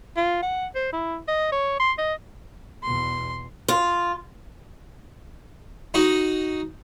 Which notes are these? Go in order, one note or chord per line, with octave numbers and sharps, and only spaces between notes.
F4
F#5
C5
E4
D#5
C#5
C6
D#5
E2 B2 C6
F4
D#4 F#4